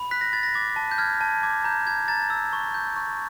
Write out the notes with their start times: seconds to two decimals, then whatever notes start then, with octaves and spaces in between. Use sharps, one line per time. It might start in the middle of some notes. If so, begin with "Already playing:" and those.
Already playing: B5
0.11 F#6 B6
0.21 A#6
0.33 B5 A6
0.43 A#6
0.54 D6 A6
0.76 A5
0.91 G6
0.98 F6 G#6
1.21 A5
1.43 D6 G#6
1.65 A#5 G6
1.87 G6 G#6
2.08 A#5 A6
2.30 E6
2.53 C#6
2.74 G6
2.96 C#6